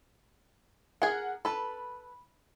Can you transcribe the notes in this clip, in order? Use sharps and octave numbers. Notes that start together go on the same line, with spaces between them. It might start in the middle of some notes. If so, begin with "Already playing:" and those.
G#4 A#4 F#5
A4 B4 B5